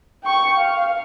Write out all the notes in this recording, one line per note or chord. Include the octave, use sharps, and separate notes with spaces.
G5 C#6
F5